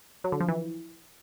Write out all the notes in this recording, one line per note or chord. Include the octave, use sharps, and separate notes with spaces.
F#3
D3
F3
E3